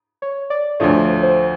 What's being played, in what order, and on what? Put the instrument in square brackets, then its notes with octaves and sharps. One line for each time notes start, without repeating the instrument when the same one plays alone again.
[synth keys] C#5
D5
[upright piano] D2 D3 F3 A3 [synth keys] C#5
[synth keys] C5